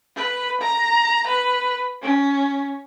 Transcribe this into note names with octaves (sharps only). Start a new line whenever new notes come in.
B4
A#5
B4
C#4